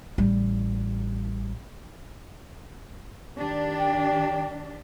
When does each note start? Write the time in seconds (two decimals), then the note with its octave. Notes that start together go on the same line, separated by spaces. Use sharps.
0.18 A1 G3
3.36 D#3 D4 G4
3.78 G5